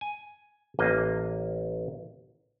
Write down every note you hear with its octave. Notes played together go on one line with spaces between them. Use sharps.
G#5
A1 A#3 D#5